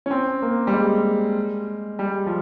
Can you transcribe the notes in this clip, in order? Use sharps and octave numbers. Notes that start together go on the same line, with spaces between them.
C#4
C4
A#3
G3
G#3
G3
F3